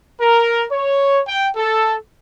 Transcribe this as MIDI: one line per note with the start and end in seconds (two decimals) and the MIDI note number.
0.19 0.64 70
0.70 1.19 73
1.27 1.48 79
1.56 1.95 69